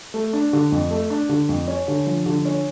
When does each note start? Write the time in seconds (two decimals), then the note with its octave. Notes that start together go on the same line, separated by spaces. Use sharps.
0.14 A3
0.33 D4
0.53 D3
0.72 F2
0.91 A3
1.10 D4
1.29 D3
1.49 F2
1.68 C#4
1.88 D3
2.07 F3
2.26 D3
2.45 C#4